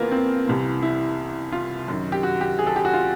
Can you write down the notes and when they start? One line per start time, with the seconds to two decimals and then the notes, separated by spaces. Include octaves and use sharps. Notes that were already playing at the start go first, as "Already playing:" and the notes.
Already playing: F2 C#3 E3 A#3 B3 F4
0.11 C4
0.47 C2 C3 E3
0.82 E4
1.52 F4
1.88 F#2 D#3
2.12 G4
2.23 F#4
2.41 G4
2.59 G#4
2.67 A4
2.76 G4
2.85 F#4
2.93 F4